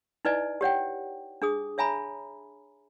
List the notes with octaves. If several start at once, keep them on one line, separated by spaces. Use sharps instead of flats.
D#4 E4 B4 D5 D#5 G#5
G4 C#5 F#5 G5
D4 G#4 D#6
C#5 E5 G#5 A#5 B5